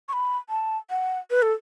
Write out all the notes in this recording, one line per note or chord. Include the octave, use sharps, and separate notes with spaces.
C#6
B5
A5
F#5
B4
A4